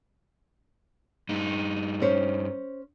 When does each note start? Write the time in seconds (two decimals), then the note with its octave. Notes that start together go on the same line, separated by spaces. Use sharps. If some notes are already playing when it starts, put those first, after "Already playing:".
1.29 G2 D#4
2.02 C#4 C5